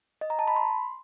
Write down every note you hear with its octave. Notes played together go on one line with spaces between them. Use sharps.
D#5
A#5
A5
B5
C6